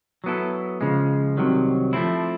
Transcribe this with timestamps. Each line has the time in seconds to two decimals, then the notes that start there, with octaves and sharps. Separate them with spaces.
0.24 F#3 B3 E4 A4
0.81 C#3 F3 G#3
1.37 C2 C3 D#3 F#3
1.93 F3 A3 C4 E4